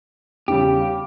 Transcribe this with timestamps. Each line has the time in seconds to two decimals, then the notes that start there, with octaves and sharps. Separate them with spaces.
0.48 E2 C#3 G3 G4
0.81 F5